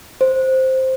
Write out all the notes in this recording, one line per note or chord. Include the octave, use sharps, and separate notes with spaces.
C5